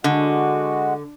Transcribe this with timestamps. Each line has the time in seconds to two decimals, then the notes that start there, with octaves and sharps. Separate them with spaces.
0.04 D3 G#3 F#4